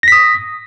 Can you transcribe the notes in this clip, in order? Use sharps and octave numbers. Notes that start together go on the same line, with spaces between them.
D#6 A#6 B6